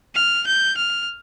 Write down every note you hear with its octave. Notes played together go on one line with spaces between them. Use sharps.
F6
G6
F6